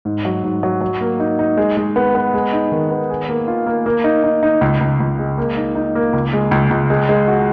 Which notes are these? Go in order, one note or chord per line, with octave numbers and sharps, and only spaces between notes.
G#2
F#3
G#2
F#3
F#3
A#3
D#4
D#4
G#3
G#3
B3
B3
G#3
D#4
D#3
B3
G#4
A#3
F4
A#3
A#3
D#4
D#4
D#4
C#2
C#2
C#2
G#3
A#3
D#4
D#4
A#3
C#2
G#3
C#2
C#2
G#3
G#3
F#4